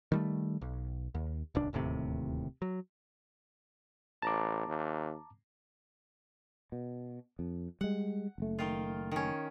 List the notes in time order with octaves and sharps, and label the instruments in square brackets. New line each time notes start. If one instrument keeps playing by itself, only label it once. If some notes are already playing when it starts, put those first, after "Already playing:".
[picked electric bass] D#3 G3 A3
B1
D#2
D#1 C#2 D4
D1 D#2 A2 C3
F#3
[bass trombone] A1 [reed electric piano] A5 A#5 D6
[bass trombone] D#2
[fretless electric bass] B2
F2
[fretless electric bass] G3 G#3 [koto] F#5
[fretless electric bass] F#1 A3
[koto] D#3 F4
D#3 C#4